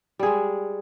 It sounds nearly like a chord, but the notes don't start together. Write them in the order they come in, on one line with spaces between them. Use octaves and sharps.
G3 G#4 G#3